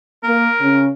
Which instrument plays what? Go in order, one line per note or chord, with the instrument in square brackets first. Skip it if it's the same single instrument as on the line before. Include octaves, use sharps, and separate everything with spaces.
[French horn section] A#3 [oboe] A#4
[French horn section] C#3 C#4